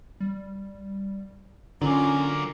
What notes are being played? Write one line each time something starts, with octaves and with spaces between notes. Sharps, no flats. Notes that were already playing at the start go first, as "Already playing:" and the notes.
G3
D3 F#3 A#3 C#4 F4